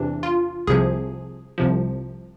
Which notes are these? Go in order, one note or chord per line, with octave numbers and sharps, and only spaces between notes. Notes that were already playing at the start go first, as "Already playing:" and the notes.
Already playing: E2 C3 E3 D4
F4
C2 C3 F3 G#4
C2 C3 F3